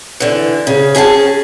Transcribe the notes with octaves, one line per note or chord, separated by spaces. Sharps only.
D3 E3
C#3
C#4 G#4 F#5 A5